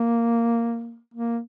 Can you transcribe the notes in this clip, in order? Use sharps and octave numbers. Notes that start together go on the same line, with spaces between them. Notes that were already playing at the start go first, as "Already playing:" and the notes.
Already playing: A#3
A#3